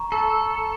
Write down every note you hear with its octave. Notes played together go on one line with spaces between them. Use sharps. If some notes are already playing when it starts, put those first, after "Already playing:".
Already playing: A#5 C#6
A4